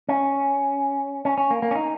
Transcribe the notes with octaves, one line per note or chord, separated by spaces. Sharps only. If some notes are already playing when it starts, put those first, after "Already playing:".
C#4
C#4
C#4
A#3
A#3
C#4
D#4